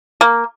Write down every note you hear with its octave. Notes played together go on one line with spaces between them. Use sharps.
A#3